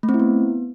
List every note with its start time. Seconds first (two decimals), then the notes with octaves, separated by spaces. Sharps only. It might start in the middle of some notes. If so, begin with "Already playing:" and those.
0.03 A3
0.09 C4
0.14 E4
0.19 B3